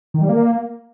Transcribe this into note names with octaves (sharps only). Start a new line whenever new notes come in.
D#3
G3
A#3